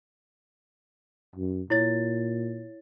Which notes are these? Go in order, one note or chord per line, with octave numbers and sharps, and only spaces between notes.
F#2
A#2 E4 C#5 A6